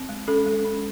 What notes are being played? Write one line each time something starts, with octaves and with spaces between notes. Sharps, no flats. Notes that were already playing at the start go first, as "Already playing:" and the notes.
Already playing: C4
G#3
C#4 A4
G#3
C#4